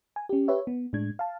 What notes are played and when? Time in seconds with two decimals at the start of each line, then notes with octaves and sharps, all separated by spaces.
0.16 G#5
0.29 C#4 G4
0.48 G4 B4 C#5 E5
0.67 B3
0.93 A2 G#3 D4 G#6
1.19 F5 A5